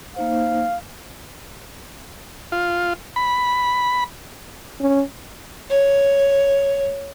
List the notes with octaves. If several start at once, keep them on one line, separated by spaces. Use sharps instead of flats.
A#3 D#4 C5 F5
F4
B5
C#4
C#5